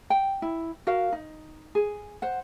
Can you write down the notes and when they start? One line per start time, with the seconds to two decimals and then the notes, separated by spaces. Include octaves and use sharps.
0.10 G5
0.42 E4
0.87 F#4 A#4 F5
1.12 D#4
1.75 G#4
2.22 C5 F#5